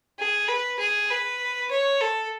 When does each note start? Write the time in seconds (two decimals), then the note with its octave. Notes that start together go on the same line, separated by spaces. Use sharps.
0.19 G#4
0.48 B4
0.79 G#4
1.10 B4
1.71 C#5
2.01 A4